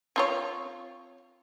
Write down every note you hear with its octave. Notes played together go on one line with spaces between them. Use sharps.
C4 F4 C#5